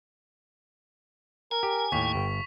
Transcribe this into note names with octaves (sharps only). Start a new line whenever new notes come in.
A#4 G#5
G4
D#2 A2 G5 C#6 B6 F7
G1